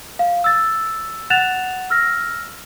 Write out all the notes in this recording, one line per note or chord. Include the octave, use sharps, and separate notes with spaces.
F5
E6 A6
F#5 F#6 A6 E7 F7
E6 F6 A#6